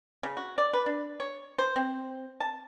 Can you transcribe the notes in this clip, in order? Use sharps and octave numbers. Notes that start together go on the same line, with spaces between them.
C#3
F#4
D5
B4
D4
C#5
C5
C4
A5